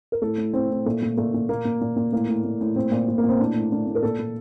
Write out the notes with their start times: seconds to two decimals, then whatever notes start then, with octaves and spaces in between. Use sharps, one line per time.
0.12 A#4
0.22 A2 A4
0.38 A2
0.53 A2 C4
0.71 A2
0.86 A#2 A3
1.02 A#2
1.17 A#2 A3
1.34 A#2
1.49 A#2 A#3
1.65 A#2
1.81 A#2
1.96 A#2
2.12 A2 A#3
2.28 A2
2.44 A2
2.61 A2
2.76 A#2 C4
2.91 A#2
3.08 A#2
3.18 A#3
3.24 A#2 C4
3.40 A2 D4
3.56 A2
3.71 A2 D4
3.87 A2
3.95 A#4
4.03 A#2 A4
4.19 A#2